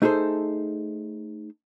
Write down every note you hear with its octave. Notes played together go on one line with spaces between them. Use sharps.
A3 D#4 G#4 A4 C5